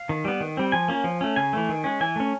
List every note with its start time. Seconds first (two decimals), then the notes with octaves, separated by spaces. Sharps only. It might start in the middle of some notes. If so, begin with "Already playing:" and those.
Already playing: F5
0.09 D#3
0.25 G3 B3
0.40 D#3
0.57 G3 C4
0.72 F3 G#5
0.88 A#3 C#4
1.04 F3
1.21 A3 C#4
1.36 C#3 G#5
1.53 E3 A3
1.69 D#3
1.84 G#3 C#4
2.00 E3 G#5
2.16 A3 C#4